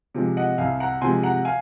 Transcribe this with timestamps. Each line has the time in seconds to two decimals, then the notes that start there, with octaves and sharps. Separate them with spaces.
0.14 C3 F3 G#3
0.37 D#5 F#5
0.58 C2 F5 G#5
0.80 F#5 A#5
1.01 C3 F3 G#3 G#5 C6
1.23 F#5 A#5
1.45 F5 G#5